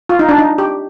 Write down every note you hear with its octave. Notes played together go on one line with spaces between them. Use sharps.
F4
D#4
D4
D#4
G4